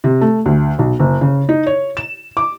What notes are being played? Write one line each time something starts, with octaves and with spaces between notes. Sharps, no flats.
C3
A3
D2
B1
F#1
C#3
D#4
C#5
E7
D6